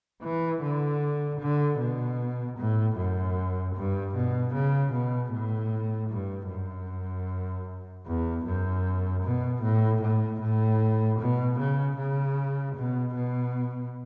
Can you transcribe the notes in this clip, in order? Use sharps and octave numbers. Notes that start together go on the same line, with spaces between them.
E3
D3
D3
B2
A2
F#2
G2
B2
C#3
B2
A2
G2
F#2
E2
F#2
B2
A2
A2
A2
B2
C#3
C#3
B2
B2